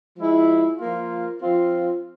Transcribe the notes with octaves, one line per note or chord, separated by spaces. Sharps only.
F3 G#3 E4
F3 A#3 F4
F3 C4 F4